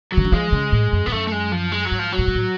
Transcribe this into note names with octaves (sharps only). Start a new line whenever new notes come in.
F#3
C#3
D3
F3 G#3
C#3
A2
F#2
G#2 B3
F#2 A3
A3
G#3
F3
G#3
F#3
G#2
F3
F#3
A2
B2
A2